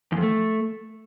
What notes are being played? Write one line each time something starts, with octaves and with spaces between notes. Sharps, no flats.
E2
F2
A3